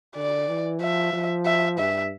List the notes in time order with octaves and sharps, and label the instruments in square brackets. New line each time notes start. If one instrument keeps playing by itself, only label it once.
[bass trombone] D3 [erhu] D5
[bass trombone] E3
[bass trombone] F3 [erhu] E5
[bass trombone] F3
[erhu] E5
[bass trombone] G2 [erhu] E5